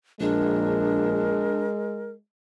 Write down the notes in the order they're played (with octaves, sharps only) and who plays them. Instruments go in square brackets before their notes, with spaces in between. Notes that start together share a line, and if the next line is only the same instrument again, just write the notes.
[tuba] A#1 [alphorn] G#3 [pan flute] D4 [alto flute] A#4